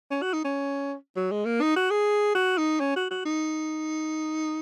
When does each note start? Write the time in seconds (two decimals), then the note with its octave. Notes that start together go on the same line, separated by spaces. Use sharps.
0.11 C#4
0.22 F#4
0.33 D#4
0.44 C#4
1.16 F#3
1.31 G#3
1.45 A#3
1.61 D#4
1.76 F#4
1.90 G#4
2.35 F#4
2.58 D#4
2.80 C#4
2.96 F#4
3.10 F#4
3.25 D#4